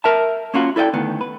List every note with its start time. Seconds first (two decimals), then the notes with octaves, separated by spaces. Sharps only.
0.04 A#4 E5 A5
0.54 A#3 C#4 F4 F#4
0.76 E4 A4 D5 D#5 G5
0.94 D2 D#3 B3
1.21 B4